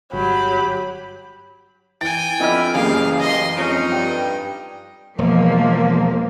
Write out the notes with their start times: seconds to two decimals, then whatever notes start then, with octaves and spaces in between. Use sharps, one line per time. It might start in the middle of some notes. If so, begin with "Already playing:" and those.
0.13 G1 F#3 G4 B5
2.01 E3 G5 G#5 A6
2.40 F2 B3 D4 E4 D#5 F6
2.74 A1 F#2 C#3 G3 G#3 A#3 G#4 F5
3.20 D#5 C6
3.57 F2 G#3 C#4 D#4
3.92 G2 G5
5.18 E1 F3 A#3